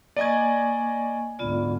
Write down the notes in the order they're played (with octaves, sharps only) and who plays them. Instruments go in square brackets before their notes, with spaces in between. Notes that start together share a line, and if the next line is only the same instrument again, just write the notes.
[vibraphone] A#3 G#5 C#6 [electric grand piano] D5 D#5 G#6
[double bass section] D2 G#2 [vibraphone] B3 F4 D5